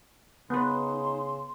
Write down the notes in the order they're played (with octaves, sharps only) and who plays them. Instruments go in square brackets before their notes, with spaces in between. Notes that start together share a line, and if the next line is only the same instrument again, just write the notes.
[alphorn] C#3 [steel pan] B3 B4 [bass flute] D#4 [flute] C6